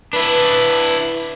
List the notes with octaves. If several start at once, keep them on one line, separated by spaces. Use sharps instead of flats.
D4 E4 B4